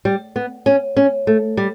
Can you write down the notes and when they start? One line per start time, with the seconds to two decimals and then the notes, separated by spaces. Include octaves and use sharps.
0.05 G3
0.36 B3
0.66 C#4
0.97 C#4
1.27 A3
1.57 G3